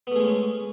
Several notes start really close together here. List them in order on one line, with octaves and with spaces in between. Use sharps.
B3 A3 G#4 G#3 C#4